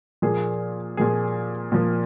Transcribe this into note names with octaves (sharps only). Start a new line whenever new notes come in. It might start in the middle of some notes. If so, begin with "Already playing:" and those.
A#2 F3 A#3 G#4
A#2 F3 A#3 G#4
A#2 F3 A#3